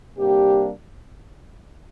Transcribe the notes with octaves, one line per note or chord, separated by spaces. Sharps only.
C3 G3 A#3 D4 G4